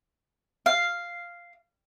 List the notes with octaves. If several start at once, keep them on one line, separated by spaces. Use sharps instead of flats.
F5